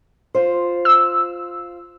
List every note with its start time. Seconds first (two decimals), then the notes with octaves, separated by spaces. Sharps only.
0.35 F4 C5
0.85 E6